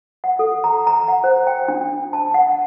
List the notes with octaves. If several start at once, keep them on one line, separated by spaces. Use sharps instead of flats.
F#5
A4
A#5
A#5
F#5
C5
G5
D4
A5
F#5